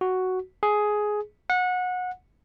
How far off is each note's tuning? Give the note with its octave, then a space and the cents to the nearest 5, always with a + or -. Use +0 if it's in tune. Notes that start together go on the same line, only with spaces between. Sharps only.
F#4 +5
G#4 +10
F#5 -25